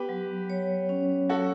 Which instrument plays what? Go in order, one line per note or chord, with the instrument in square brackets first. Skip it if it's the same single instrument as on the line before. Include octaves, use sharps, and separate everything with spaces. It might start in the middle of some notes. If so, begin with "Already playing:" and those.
Already playing: [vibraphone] B3 [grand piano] G4 B4
[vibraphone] F#3
C#5
C#4
[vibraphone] F#3 [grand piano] F#4 A4